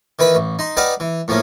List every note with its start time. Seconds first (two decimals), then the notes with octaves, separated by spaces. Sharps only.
0.19 D#3 E3 B4 B5
0.35 A1
0.59 D#4 C6
0.77 D#4 G4 B4 D5 F5 F#5
1.00 E3
1.28 A2 F3 A#3 C#4